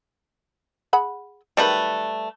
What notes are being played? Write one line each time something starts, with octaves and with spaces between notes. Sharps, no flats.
G#4 F#5 B5
D#3 F#3 G3 A3 B4